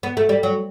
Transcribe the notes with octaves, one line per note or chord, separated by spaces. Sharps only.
B3
A3
G3
F#3